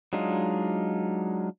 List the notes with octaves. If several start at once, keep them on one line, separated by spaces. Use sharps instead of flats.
F#3 G#3 D4 D#4 F4